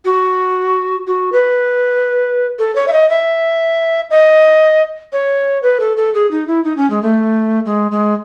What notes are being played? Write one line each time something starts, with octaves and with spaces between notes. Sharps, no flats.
F#4
F#4
B4
A4
C#5
E5
D#5
E5
D#5
C#5
B4
A4
A4
G#4
D#4
E4
D#4
C#4
G#3
A3
G#3
G#3